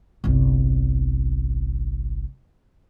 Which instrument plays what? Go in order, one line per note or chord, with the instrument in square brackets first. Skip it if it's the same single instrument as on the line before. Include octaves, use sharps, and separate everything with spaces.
[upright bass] G1 C2